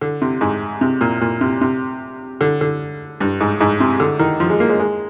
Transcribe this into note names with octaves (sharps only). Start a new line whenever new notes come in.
D3
C3
G#2
C3
A#2
A#2
C3
C3
D3
D3
G2
G#2
G#2
C3
D3
D#3
F3
G#3
A#3
G#3
G#3